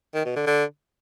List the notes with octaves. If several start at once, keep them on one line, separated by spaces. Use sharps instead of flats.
D#3
B2
D3
D3